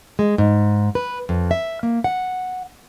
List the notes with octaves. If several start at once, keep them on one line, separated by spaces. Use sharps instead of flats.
G#3
G#2
B4
F2
E5
A#3
F#5